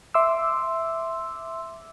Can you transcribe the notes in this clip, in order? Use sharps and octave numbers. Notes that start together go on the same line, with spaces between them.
E5 C6 D6 E6